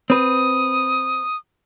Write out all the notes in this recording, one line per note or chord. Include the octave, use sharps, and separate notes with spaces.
C4 B4 D#6